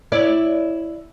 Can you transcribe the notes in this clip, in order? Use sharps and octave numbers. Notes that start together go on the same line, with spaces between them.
E4 C#5 D5